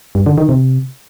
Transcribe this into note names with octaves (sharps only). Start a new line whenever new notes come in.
G2
D3
D#3
C3